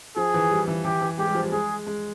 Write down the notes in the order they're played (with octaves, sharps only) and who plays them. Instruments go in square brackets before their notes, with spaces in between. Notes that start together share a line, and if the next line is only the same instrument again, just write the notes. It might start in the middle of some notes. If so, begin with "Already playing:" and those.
[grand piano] F3 [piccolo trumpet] G#4
[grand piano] E3
G3
E3
[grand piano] E3 [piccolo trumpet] G4
[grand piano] E3
[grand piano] G#3 [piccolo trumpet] G4
[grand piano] G3
F3
G3
[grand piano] G#3 [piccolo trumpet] G#4
[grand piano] G#3